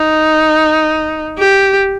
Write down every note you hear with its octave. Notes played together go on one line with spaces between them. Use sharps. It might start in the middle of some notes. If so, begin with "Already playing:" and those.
Already playing: D#4
G4